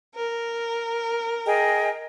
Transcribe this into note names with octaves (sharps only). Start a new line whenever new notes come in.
A#4
G#4 D#5 G5